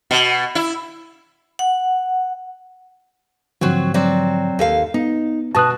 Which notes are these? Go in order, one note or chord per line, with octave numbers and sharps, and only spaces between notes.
B2
E4
F#5
G#2 D3 F3 F#3 C4 F#4
F#3 C4 D5
D#2 A4 F5
B3 D#4
B2 F#4 A5 D#6 F#6